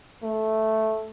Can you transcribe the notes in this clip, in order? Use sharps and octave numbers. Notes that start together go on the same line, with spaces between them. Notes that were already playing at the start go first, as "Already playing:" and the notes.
A3